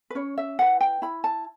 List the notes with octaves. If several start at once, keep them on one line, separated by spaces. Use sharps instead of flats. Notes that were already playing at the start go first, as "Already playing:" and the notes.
B4
C#4 C#5
E5
E4 B4 F#5
G5
E4 B5
A5